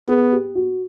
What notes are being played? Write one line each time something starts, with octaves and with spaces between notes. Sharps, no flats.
B3 G#4
G4
F#4